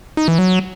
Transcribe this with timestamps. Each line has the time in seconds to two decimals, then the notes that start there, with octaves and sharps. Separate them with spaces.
0.17 D#4
0.28 E3
0.39 F#3